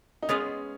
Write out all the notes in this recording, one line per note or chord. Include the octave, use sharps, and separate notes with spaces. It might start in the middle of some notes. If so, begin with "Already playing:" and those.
D#4
G#3 B3 C#4 F4 G#4